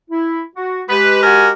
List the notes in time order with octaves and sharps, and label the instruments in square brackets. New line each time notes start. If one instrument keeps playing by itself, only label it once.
[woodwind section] E4
F#4
[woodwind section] G#3 G4 [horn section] B4
[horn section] F#4 A#4 G#5